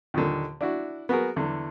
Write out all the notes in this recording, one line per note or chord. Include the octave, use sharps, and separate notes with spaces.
D#2 A#2 D3
D4 E4 F#4
B3 F#4 G#4 A#4
E2 D3